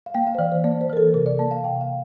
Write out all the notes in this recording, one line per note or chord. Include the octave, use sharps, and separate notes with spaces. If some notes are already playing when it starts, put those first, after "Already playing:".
F5
A#3 G5
F5
C5
E3 D5
C5
A#3 D5
C5
E3 A#4
A4
C3 A#4
D5
A#3 A5
F5
C3 G5
F5